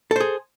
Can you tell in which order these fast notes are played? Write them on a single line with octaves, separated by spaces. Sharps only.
A4 C5 G#4